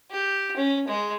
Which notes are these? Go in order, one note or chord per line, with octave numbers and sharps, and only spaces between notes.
G4
C#4
G#3